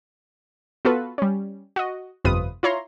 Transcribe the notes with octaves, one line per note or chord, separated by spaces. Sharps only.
B3 F4 F#4 A4 B4
G3 C#4
F#4 D#5
G1 F2 C3 F4 B4 D#6
E4 F4 C#5 A#5 C6